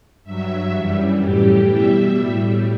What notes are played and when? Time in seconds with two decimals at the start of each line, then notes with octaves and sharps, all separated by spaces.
0.23 G2 F#3 E5
0.72 F#2 E3 G3
1.21 A2 E3 G3 G4
1.69 B2 G3 E5
2.18 A2 G3